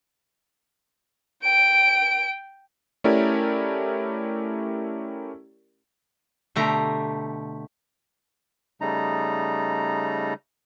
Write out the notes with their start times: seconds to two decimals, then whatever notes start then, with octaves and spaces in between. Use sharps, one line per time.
1.43 G5 D7
3.04 A3 C#4 E4 G4 A#4 D5
6.56 B2 D3 A3 G4 A#5
8.81 C#3 G3 A3 D#4 A#5